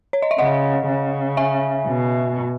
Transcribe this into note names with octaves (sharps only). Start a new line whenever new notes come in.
C#5
D#5
E5
C#3 D#5 F#5
C#3
E5 G#5
B2